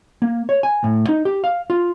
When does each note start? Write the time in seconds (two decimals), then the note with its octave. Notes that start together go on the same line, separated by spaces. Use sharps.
0.22 A#3
0.49 C#5
0.63 G#5
0.84 A2
1.09 D#4
1.25 G4
1.44 F5
1.70 F4